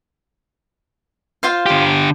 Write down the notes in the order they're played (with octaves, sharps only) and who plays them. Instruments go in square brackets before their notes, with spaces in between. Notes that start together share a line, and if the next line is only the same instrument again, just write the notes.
[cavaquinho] F4 C5 F5
[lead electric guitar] D3 G4